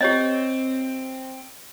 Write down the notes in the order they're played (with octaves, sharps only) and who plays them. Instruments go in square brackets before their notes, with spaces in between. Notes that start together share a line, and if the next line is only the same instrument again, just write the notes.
[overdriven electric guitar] C4 [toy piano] G4 C#5 D#5